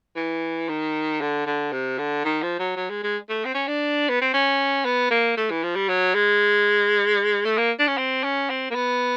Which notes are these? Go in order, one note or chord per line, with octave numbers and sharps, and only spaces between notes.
E3
D#3
D3
D3
C3
D3
D#3
F3
F#3
F#3
G#3
G#3
A3
C4
C#4
D4
B3
C4
C#4
B3
A#3
A3
E3
F3
G3
F#3
G#3
A3
A#3
D4
C#4
C4
C#4
C4
A#3
B3